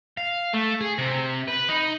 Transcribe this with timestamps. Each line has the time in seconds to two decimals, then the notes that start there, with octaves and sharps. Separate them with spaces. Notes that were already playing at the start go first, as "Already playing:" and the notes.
0.17 F5
0.53 A3
0.81 G#4
0.98 C3
1.48 B4
1.69 D#4